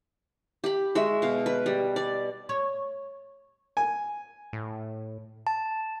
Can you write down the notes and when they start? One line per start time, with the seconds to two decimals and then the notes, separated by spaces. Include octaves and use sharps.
0.64 G4 B5
0.95 G#3 F#4 E5
1.22 B2 F5
1.46 B4
1.66 G3
1.96 D5
2.49 C#5
3.77 G#5
4.53 A2
5.47 A5